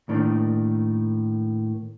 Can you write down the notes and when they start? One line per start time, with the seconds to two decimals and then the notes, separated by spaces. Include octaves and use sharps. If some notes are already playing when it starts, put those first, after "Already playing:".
0.09 A2 D#3 A#3 D4